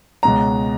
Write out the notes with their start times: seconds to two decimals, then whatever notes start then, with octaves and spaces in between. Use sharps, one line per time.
0.23 C#2 B2 G#3 A#5